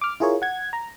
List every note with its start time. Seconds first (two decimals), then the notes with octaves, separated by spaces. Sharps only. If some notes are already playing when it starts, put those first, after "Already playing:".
0.01 D6 F6
0.20 E4 F4 G#4 A#4 C#5
0.42 F#5 G#6
0.73 A#5